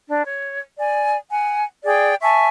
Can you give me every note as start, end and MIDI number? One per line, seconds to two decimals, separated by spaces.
0.10 0.21 62
0.26 0.60 73
0.78 1.16 74
0.78 1.16 80
1.30 1.64 78
1.30 1.64 80
1.84 2.14 68
1.84 2.14 74
1.84 2.14 79
2.21 2.48 76
2.21 2.48 80
2.21 2.48 81
2.21 2.48 85